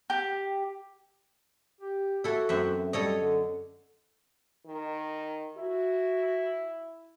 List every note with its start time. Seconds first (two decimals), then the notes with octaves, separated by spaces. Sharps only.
0.10 G4
1.81 G4
2.24 E4 F#4 A4
2.49 F#2 C4 E5
2.93 G3 A4 C#5 D#5
3.18 D3
4.66 D#3
5.57 E4 F#4